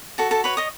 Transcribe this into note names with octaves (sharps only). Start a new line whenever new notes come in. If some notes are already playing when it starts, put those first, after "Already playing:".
F#4 A4 A5
A4 A5
B4 C#5 B5
D#5 D#6